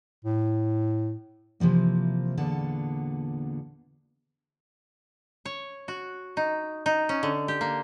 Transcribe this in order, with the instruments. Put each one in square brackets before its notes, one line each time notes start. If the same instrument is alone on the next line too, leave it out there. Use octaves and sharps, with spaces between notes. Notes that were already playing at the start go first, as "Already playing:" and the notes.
[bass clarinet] A2
[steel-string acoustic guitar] C3 E3 F3 A#3
E2 A#2 D3 B3 A4 A5
[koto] C#5
F#4
D#4
D#4
C#4
D3
G4
A#3